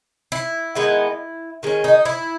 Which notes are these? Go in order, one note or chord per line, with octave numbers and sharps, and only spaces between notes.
E4
D#3 G#3 B3
D#3 G#3 C#4
D#4
E4